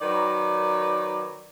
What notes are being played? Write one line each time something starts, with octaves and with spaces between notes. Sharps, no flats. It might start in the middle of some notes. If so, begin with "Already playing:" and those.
D#3 F#3 B4 D5